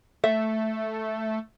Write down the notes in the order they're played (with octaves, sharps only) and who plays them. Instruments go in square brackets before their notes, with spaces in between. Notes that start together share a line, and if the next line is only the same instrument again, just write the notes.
[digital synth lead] A3 [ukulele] E5